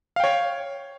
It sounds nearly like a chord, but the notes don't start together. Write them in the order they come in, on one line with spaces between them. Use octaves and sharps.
F5 G5 C#5